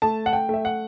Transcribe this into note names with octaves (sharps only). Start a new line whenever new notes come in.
A3 A5
F#5
G5
A3 E5
F#5